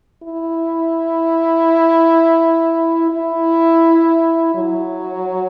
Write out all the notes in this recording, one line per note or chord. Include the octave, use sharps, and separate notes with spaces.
E4
E4
F#3